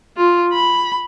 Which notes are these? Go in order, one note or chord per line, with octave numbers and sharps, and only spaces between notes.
F4
B5